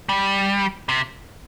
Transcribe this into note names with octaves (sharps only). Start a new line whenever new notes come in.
G3
C3